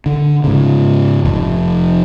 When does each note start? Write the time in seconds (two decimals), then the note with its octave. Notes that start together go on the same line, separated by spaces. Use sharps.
0.06 D3
0.44 G#2 C#3
1.25 F1 F2